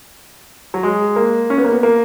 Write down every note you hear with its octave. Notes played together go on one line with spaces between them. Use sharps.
F#3
G#3
A#3
C#4
B3
A#3
B3
A#3